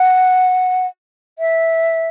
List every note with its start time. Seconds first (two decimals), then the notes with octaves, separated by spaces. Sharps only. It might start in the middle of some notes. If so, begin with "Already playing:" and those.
Already playing: F#5
1.39 E5